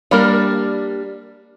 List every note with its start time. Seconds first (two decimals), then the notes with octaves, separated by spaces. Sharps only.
0.11 G3 A#3 D4 A#4